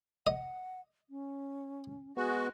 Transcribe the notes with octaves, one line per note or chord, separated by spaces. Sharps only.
D#5 F#5
C#4
G#3 B3 F#4